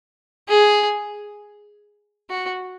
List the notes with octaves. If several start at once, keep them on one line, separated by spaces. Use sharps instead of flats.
G#4
F#4